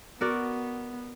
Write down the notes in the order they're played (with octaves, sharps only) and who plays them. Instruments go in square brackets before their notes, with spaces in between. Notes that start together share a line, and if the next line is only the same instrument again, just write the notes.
[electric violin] B3 [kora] F#4 A#4 D5